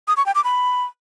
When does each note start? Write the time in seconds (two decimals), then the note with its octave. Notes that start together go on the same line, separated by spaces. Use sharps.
0.08 D#6
0.17 C#6
0.26 G5
0.35 D6
0.44 B5